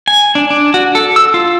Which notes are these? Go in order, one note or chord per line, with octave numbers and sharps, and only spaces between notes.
G#5
D4
D4
F#4
A4
E6
F4